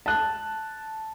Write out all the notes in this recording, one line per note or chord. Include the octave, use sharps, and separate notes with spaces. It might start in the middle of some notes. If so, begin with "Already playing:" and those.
A5 F#6